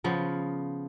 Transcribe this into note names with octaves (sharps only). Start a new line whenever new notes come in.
C#3 F3 B3